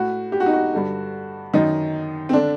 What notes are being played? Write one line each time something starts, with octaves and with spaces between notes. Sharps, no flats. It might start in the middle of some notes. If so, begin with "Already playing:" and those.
Already playing: A2 F#4
G4
F#4
D#4
F#4
G2 D3
F#2 D#3 D#4
C4
D3 D4